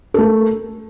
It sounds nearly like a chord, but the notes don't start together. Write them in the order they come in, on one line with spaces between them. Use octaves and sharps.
A4 A3 A#4